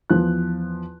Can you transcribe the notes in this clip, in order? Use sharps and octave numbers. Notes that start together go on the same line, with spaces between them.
E2 F3 F#6